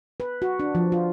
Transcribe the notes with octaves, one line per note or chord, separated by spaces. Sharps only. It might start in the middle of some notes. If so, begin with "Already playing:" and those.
B4
F#4
D4
F3
F4